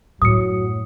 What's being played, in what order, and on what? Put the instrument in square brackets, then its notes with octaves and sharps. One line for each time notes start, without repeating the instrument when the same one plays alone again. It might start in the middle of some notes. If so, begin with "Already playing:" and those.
[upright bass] F#2 A2 [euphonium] F#3 [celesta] D#6 C#7